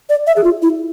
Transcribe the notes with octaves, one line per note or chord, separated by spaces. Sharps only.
D5
E5
G#4
F4
E4